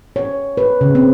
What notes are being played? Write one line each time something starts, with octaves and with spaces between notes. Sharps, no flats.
C#5
B4
C#3
C4